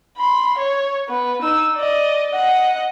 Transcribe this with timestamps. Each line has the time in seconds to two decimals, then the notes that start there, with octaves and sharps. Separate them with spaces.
0.18 B5 C6
0.58 C#5
1.08 B3 B4
1.42 D#4 E6
1.76 D5 D#5
2.30 D#5 F#5